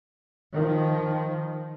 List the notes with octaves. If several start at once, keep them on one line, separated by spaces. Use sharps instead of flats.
D#3 F3